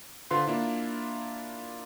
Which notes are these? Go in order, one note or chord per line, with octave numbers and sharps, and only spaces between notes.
D3 F4 B4 C5 C6
A#3 D4 E4 F4